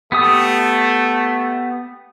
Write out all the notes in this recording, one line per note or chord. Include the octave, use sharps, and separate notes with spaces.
A3 B3 G4 D#6